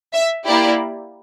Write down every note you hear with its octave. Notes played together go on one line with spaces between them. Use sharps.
E5
A#3 E4 G4 D5